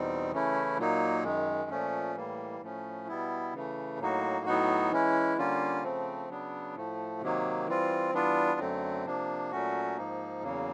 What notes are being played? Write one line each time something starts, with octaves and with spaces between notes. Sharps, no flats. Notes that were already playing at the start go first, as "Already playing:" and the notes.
Already playing: E2 B2 G3 C4 D#4
C#3 E3 A3 C#4 E4
A#2 F#3 A#3 D#4
F#2 D#3 G#3
A#2 F3 A3 C#4
A2 E3 G3 A#3
A2 F3 A3 C#4
B2 G3 B3 E4
C#3 E3 A3
A2 F#3 A#3 D#4 F#4
A2 F#3 B3 D#4 F#4
E3 G#3 C#4 E4
D3 G3 A#3 C#4 F4
C#3 F3 A3 C4
C#3 F#3 B3 D4
A2 F3 A3
C3 D#3 F#3 A#3
E3 G3 C4 F4
E3 G3 B3 D4 F4
F#2 D3 F#3 A3 C4
C3 F3 A#3 D4
A#2 F#3 A3 C#4 F#4
G#2 F3 A#3 D#4
E2 C#3 F#3 A#3